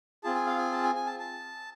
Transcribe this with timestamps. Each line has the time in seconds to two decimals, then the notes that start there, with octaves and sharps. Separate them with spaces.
0.24 C4 F4 G#4 A5
0.35 G#5
0.47 F5
0.58 G#5
0.72 A5
0.83 G#5
0.95 G#5
1.07 A5
1.19 A5